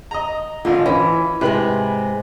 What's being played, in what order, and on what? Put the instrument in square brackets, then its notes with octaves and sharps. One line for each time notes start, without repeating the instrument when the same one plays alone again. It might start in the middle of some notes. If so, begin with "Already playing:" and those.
[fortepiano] D#5 A#5
[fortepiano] G#1 D3 [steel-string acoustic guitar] F4
[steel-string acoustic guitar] E3 [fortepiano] C#4
[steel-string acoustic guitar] G#2 G#3 [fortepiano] C3 B4 B5